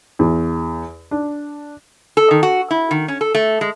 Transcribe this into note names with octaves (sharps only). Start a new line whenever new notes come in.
E2
D4
A4
D#3
F#4
E4
D#3
C#4
A4
A3
G#3